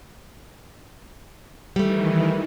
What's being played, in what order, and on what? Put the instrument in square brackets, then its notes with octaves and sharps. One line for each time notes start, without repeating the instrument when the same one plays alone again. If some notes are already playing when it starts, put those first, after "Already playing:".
[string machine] D#3 E3 [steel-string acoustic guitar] G3 A3